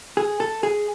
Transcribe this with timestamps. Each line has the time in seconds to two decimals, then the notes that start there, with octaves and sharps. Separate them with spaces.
0.17 G#4
0.40 A4
0.63 G#4